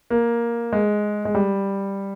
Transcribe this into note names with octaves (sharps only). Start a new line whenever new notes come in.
A#3
G#3
G#3
G3